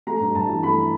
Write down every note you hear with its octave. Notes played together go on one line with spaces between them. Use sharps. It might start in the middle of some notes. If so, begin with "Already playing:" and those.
A3 A#5
G2
G2 A5
E3
A3 B5